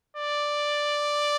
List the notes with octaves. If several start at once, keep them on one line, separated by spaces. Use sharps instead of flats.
D5